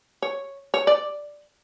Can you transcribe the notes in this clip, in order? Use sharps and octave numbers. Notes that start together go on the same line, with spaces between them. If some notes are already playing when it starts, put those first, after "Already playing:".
C#5
C#5
D5